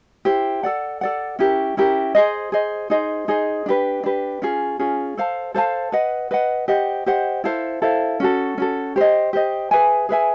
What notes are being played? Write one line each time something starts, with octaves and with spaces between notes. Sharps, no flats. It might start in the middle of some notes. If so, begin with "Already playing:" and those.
E4 G4 C5
A4 D5 F#5
A4 D5 F#5
C#4 E4 G4 A#4
C#4 E4 G4 A#4
G#4 C5 D#5
G#4 C5 D#5
D#4 G#4 C5 D#5
D#4 G#4 C5 D#5
D4 G4 B4
D4 G4 B4
C#4 F4 G#4
C#4 F4 G#4
A4 C5 F5 A5
A4 C5 F5 A5
B4 D#5 F#5
B4 D#5 F#5
G4 C5 D#5 F#5
G4 C5 D#5 F#5
E4 A4 C5 F5
E4 A4 C5 F5
C#4 F#4 A4
C#4 F#4 A4
G4 C5 D#5
G4 C5 D#5
G#4 B4 E5 G#5
G#4 B4 E5 G#5